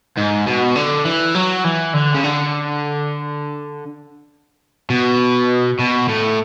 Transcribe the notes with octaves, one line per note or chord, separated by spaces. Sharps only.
G#2
B2
D3
E3
F#3
E3
D3
C#3
D3
B2
B2
A2